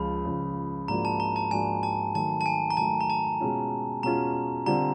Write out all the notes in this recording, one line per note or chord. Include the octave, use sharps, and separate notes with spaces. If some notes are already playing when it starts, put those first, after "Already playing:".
Already playing: C#2 C#3 F3 B5
C#2 C#3 F3
G#2 F3 A#3 D4 F#4 A#5
A5
A#5
A5
G#2 F3 A#3 D4 F#4 G#5
A5
D#3 F#3 A3 A5
A5
G#5
A#5
D#3 F#3 A3 A5
A#5
A5
B2 G#3 C#4 F4
B2 G#3 C#4 F4 A#5
D3 G3 C4 F4 A#5